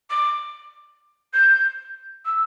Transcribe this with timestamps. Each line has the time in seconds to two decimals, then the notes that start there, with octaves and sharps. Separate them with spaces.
0.10 D6
1.33 G6
2.25 E6